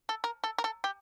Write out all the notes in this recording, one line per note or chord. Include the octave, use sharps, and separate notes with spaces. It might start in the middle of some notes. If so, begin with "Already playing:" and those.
A4
A#4
A4
A#4
A4
G4